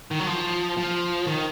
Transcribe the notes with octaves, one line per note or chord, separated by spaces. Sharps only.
D#3
F#3
F3
F3
D#3